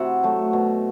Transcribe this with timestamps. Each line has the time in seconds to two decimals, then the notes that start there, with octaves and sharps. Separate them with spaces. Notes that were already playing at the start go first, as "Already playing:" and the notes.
Already playing: C3 E4 F#4 E5 F#5
0.23 F#3 A3
0.53 B2